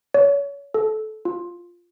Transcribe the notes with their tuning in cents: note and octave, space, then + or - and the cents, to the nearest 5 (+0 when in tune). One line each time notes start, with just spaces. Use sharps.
C#5 +30
A4 -20
F4 +0